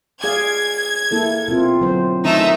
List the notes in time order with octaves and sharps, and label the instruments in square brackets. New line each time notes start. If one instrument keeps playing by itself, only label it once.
[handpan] G#4 D5 F5 [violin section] G#6
[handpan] A#3 E4 A4
B2 C4 F4
D3 F#3 C5
[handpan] D#3 C#4 E4 [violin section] A3 D#4 E5